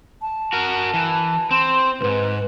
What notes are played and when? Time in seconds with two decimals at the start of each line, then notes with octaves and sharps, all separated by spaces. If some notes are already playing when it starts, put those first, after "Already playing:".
0.22 A5
0.53 F#4 A#4
0.94 E3
1.51 C4 C6
2.01 C#2 G#2 B4